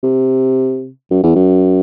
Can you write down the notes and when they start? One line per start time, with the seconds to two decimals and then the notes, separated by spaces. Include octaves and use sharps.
0.03 C3
1.11 F#2
1.24 E2
1.35 F#2